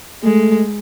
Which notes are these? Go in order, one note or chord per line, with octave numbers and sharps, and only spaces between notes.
G#3 A3